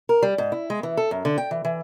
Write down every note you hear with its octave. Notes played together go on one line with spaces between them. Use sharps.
A#4
G3
G#2
E4
G#3
E3
A4
F#2
D3
G5
E3
E3